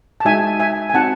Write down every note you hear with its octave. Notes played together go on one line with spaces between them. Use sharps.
A5
G#3 D#4 F#4 E5 G#5
E5 G#5
G#5
C4 D#4 F#4 F#5 A5